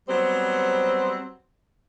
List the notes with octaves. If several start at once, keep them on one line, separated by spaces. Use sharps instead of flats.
F#3 G3 B3 C4 C5